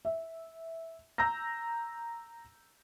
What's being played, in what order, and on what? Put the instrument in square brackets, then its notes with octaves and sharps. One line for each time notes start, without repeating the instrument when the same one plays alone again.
[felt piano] E5
A#5 E6 G6 A#6